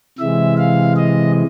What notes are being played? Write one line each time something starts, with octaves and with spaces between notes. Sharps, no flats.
C3 E3 G#3 E5
F5
D#5